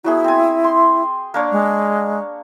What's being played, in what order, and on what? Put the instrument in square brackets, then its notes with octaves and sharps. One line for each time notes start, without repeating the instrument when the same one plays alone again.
[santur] F#3 B3 G#4 [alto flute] E4
[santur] C4 G#5
C6
A#3 D4 C#5
[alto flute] G#3